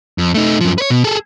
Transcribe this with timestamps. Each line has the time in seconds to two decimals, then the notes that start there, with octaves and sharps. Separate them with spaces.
0.18 F2
0.34 A3 D#4
0.61 F#2 F3
0.78 B4 C#5
0.90 B2
1.04 G#4 A4